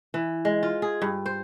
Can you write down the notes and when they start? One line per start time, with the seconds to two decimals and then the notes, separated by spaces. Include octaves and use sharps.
0.14 E3
0.45 G#3
0.63 F4
0.82 G#4
1.02 G2
1.26 C5